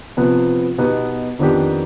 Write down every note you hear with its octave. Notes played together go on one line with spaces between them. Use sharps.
C3 F3 B3
B2 B3 D#4 G4
F2 D#3 B3 D4 G4